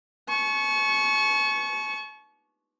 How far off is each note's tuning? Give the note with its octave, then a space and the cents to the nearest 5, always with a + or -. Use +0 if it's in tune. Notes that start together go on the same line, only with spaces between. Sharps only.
A5 -45 C#6 +0